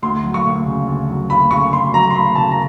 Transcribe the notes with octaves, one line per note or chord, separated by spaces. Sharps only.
D2 C6
F#3
C#6
D2
C#3
D2
F#3
D2 B5
C#3 C#6
D2 C6
F#3 A#5
C6
D2 B5
C#3 A5
A#5